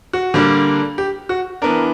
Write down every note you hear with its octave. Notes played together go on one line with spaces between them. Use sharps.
F#4
D3 G3 A#3 D4
G4
F#4
E3 B3 D4 A#4